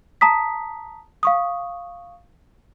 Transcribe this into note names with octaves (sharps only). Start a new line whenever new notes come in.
A5 A#5 D#6 B6
F5 C#6 D#6